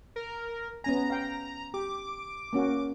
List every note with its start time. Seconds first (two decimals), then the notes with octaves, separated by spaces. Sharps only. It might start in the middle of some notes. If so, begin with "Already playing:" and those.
0.16 A#4
0.84 B3 C#4 G#5 A#5
1.10 F5 G5
1.74 G4 D6
2.53 A#3 C#4 F#4